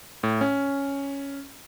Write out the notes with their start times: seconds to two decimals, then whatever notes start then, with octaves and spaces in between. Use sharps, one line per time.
0.23 A2
0.41 C#4